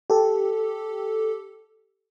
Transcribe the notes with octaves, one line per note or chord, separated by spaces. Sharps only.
G4 A4